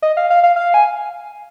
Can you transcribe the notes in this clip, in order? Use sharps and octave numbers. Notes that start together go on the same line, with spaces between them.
D#5
F5
F5
F5
F5
G#5